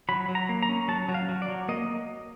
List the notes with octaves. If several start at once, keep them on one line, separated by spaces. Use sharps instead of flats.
F#3 B5
F#3
A#5
A#3
A#5
C#4
F#3 A5
F#3
F5
F#3
D5
F#3
A#3 D#5